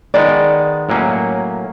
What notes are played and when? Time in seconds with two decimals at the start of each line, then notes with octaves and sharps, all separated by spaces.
0.14 D#3 G#3 B3 D5
0.89 A2 F#3 A#3 C#4